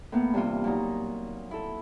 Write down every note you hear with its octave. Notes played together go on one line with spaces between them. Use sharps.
A2 A#3 B3
G2 C3 E3 F4
A#2 F#3 D#4 A#5
E4 A4